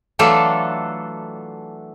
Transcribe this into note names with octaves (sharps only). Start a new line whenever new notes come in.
E3 F#3 A3 D4 F4 A4